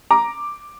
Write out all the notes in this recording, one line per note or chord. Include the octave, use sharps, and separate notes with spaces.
A#5 D6